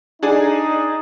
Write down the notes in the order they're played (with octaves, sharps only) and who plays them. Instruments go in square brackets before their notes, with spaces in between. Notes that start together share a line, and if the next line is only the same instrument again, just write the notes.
[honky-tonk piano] D4 G#4 G#5 [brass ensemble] D#4